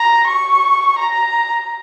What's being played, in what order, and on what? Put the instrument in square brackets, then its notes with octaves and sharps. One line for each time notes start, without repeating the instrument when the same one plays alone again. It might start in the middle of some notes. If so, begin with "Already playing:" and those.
Already playing: [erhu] A#5
C#6
A#5